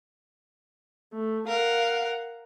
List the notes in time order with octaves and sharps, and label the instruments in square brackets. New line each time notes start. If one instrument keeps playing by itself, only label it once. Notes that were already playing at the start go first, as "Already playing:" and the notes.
[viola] A3
[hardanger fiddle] A#4 [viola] F5 F#5